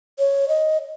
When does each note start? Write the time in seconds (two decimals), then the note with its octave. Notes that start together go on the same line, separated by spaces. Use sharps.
0.19 C#5
0.48 D#5